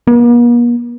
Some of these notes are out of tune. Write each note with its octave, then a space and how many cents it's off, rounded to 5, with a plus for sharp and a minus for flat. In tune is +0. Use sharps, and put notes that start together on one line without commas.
A#3 +45